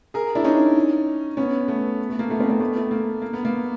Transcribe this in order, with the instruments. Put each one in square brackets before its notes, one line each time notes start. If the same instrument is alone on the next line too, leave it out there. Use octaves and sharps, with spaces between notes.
[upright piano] G#4 A#4
D4 E4
C#4 D#4
B3 C#4
A3 B3
A3
A#3
A3 B3
A#3 C4
A#3 C4
A3 B3
A3
A#3
A#3
B3
A#3